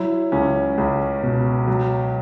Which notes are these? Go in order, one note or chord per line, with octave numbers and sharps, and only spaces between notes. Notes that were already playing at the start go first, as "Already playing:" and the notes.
Already playing: F#3 E4
C#2 C#4
C#2
B2
F#3